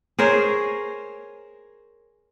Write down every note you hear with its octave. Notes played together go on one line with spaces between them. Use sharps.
G#4 A#4 C5 C#5